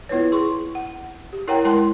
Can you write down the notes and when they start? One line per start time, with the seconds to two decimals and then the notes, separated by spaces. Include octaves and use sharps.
0.09 B3 E4 F4 B4 C#5
0.32 G#4 C6 C#6
0.75 F#5
1.33 G4
1.48 E4 A#4 C#5 F#5 G5 A#5
1.65 G#3 E4 A#4 F#5 A5 C6